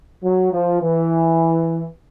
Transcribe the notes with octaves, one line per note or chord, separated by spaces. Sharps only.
F#3
F3
E3